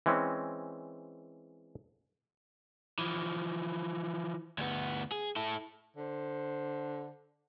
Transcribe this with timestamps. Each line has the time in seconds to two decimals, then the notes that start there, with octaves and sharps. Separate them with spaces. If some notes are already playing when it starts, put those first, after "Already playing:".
0.06 E3 G#3 C4 C#4
2.98 E3 F3
4.58 D2 B3
5.11 G#4
5.36 E4 A4
5.97 D3 C5